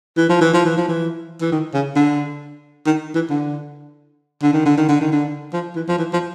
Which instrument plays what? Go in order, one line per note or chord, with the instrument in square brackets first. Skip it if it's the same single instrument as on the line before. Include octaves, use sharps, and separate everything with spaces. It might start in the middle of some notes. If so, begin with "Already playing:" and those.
[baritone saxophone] E3
F3
E3
F3
E3
F3
E3
E3
D#3
C#3
D3
D#3
E3
D3
D3
D#3
D3
D#3
D3
D#3
D3
F3
E3
F3
E3
F3